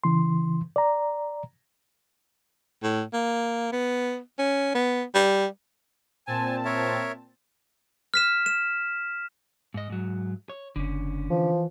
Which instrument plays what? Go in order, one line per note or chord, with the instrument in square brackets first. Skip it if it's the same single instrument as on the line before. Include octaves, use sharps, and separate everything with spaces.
[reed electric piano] C#3 E3 C6
D5 A#5
[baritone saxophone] A2
A#3
B3
C#4
B3
G3
[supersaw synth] A#2 C4 A5 [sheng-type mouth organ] G#5
[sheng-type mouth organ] A#4 C#5 E5
[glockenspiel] F6 B6 E7
E7
[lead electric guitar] G#2 D#5
G#2 F#3
C#5
[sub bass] F#1 [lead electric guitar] D3 C#4
[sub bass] E3 [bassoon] F3